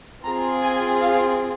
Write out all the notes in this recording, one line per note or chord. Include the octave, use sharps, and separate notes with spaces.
C4 F4 G#4 A#5
G#5
F5